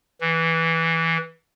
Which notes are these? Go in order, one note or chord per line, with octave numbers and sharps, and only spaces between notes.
E3